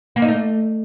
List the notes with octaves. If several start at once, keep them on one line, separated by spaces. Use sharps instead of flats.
A#3
D#4
A3